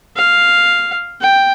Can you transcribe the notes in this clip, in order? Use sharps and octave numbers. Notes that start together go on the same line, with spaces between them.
F5
G5